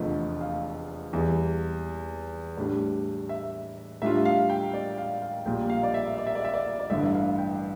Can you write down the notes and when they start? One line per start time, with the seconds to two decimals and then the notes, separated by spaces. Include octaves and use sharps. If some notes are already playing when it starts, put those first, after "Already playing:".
Already playing: F1 E2 D3 F3 A3
0.41 F5
1.13 E2 E3 G3
2.57 A2 G3 D4
3.29 E5
4.02 A2 G3 D4 F4 E5
4.25 F5
4.50 G5
4.74 D5
4.98 F5
5.22 F5
5.46 A#1 A#2 G3 A#3 G5
5.70 F5
5.83 D5
5.94 E5
6.18 D5
6.27 E5
6.35 D5
6.45 E5
6.54 D5
6.80 D5
6.90 A1 G2 D3 E5
7.14 F5
7.38 G5